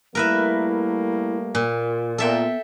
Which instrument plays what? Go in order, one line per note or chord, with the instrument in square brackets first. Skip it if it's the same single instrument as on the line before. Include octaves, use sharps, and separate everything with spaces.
[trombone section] G3 A3 A#3 [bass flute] E4 [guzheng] A#4 B4 E5
[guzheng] A#2 [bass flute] F4
[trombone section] A#2 [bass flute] B3 [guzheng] A4 E5 G5